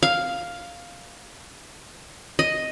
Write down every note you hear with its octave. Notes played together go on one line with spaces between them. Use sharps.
F5
D#5